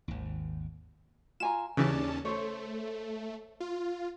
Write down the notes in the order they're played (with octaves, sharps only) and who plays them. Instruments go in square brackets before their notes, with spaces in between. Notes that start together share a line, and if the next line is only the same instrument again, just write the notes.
[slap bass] G#1 D#2
[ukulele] F4 G#5 A#5 [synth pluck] E7
[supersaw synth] D#2 C#4 A5 [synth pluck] C#3 E3 [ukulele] D4 G#4 D5
[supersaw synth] A3 [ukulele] C5 C#5
[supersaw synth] F4